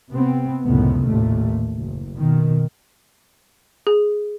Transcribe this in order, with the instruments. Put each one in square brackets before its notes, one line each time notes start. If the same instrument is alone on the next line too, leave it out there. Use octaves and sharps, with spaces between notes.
[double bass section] C3 B3 C4
C#2 F#2 A2 C3 D#3 B3
A1 D#2 A#2 A3
F#1
B2 D#3
[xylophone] G#4